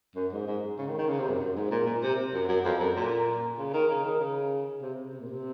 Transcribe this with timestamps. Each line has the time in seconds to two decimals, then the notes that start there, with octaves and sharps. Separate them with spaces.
0.16 F#2
0.32 G#2
0.47 G#2
0.78 C#3
0.88 D#3
0.98 D#3
1.08 C#3
1.19 C3
1.29 F#2
1.40 F#2
1.56 G#2
1.71 A#2
1.86 A#2
2.02 C3
2.33 F#2
2.48 F#2
2.65 F2
2.80 F#2
2.96 A#2
3.58 C#3
3.74 D#3
3.89 C#3
4.04 D#3
4.19 C#3
4.82 C3
5.13 C3
5.20 A#2
5.27 C3